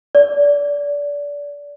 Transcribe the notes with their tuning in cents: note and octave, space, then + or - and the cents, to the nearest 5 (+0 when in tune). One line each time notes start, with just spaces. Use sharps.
D5 -25